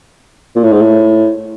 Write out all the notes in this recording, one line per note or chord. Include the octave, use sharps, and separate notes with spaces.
A#2
A2
G#2
A2